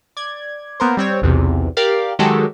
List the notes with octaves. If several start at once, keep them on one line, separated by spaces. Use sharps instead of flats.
D5 G#6
A#3 B3 A#4 C5
G3 C4 C#5
B1 E2 C3
G4 A#4 D5 F5
D#3 F#3 G#3 F#4 G4 A4